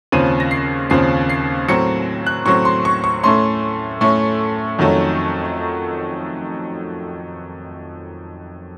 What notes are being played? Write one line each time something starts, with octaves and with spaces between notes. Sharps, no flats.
D#2 C#3 F3 C4 D#7
A#6
C7
D#2 C#3 F3 C4 C7
C7
A2 F#3 C4 C#7
F#6
A2 F#3 C4 C#6
C6
C#6
C#6
A2 A3 C#4 C6
A2 A3 C#4
F2 D#3 F#3 A3 C#4